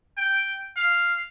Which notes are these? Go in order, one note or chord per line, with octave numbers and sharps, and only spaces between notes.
G5
F5